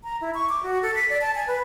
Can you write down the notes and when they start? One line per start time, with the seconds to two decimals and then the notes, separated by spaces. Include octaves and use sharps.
0.04 A#5
0.21 E4
0.34 C#6
0.49 D6
0.63 F#4
0.82 A4
0.95 B6
1.09 D5
1.21 A5
1.35 G#5
1.47 B4